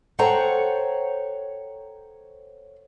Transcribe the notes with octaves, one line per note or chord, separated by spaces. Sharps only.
A4 C5 C#5 F#5 G5 A#5